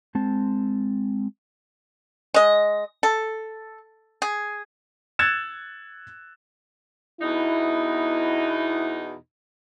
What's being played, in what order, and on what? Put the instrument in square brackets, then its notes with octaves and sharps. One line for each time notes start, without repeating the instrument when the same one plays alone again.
[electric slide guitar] G#3 C4 A5
[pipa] G#3 D#5
A4
G#4
[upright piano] E6 F#6 G#6 A6 C#7 E7
[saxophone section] E2 B2 D#4 [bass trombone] E4